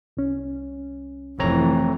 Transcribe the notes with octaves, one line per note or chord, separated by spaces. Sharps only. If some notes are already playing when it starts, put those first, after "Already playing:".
C2 C#4
F1 E3 A3 C4 C#5 A#5